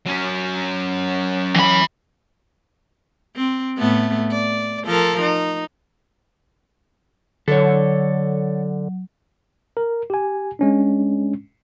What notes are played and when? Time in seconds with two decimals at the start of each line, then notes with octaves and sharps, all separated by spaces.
0.06 F#3 C#4
1.56 E3 B5
3.36 C4
3.78 A2 A3 B3
4.32 D5
4.85 F3 A4 A#4
5.21 D#4
7.48 D3 F#3 A4 C#5
9.77 A#4
10.10 G4 G#5
10.59 G#3 C#4 D4